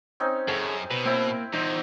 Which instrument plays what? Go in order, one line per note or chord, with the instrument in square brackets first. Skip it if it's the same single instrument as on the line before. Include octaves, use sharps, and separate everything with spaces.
[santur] C4 C#4 D#4
[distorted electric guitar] F#2 [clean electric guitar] G#4 A4 C#5
[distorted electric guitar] B2 [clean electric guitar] B4
[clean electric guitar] A#3 [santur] C4 E4
[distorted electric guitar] E2 A#2 [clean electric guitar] D#4 [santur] C5